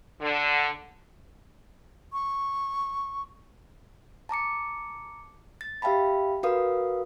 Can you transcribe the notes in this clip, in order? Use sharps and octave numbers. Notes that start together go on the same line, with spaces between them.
D3
C#6
A5 A#5 D6 C#7
A6
G4 E5 F5 G5 A5 B5
F#4 A#4 B4 F5 D#6